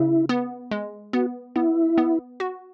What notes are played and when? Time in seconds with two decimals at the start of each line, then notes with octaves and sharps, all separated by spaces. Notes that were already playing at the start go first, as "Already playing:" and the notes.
Already playing: C#3 E4
0.29 B3
0.71 G#3
1.13 B3 F#4
1.56 B3 E4
1.98 B3
2.40 F#4